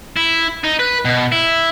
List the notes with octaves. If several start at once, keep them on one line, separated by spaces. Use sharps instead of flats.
E4
D#4
B4
B2
E4